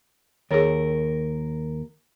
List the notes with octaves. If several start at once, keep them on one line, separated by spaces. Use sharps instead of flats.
D#2 G#4 A#4 C#5